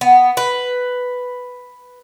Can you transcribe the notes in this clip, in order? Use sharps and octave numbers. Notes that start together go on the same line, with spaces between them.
B3
B4